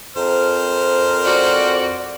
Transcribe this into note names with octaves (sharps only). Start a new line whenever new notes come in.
F2 A#4 C5 F6
F#4 D5